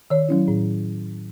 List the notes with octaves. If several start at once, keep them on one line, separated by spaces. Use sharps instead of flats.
D#3 C#5
F#3 C#4 E4
A2